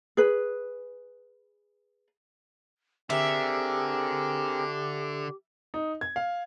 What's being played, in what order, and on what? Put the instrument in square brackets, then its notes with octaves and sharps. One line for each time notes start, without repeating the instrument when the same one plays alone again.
[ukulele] G#4 B4
[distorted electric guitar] D3 [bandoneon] C4 G#4 A#4 [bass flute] G4 [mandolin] E5
[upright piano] D#4
G#6
F5